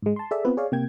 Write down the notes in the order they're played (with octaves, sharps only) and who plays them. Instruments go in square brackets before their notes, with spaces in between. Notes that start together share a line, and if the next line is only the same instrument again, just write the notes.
[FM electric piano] G#2 G#3
A5 C6
G#4 A4 D5 E5
B3 C4 F4 B4
G#4 C#5 D5 F5
C3 A#3 G5 G#6